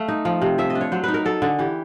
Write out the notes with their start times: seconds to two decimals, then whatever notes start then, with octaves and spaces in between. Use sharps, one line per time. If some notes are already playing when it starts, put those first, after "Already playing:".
Already playing: A3 F5
0.08 D#4
0.25 F3
0.42 C3
0.58 F3 E5
0.70 D#5
0.75 D4
0.81 C#5
0.92 F#3 C5
1.04 D#4 B4
1.14 A#4
1.25 F#3 A4
1.42 D3 G#4
1.59 E3 G4